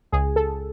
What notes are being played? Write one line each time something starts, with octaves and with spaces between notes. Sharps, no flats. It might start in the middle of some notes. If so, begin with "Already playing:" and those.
C#2 G#4
A4